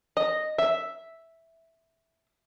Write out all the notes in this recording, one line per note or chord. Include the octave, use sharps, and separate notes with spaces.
D#5
E5